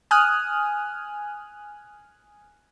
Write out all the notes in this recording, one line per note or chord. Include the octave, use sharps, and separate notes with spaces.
G#5 D#6 F6 F#6